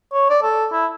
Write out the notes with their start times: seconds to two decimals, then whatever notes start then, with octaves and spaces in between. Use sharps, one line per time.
0.13 C#5
0.30 D5
0.43 A4
0.72 E4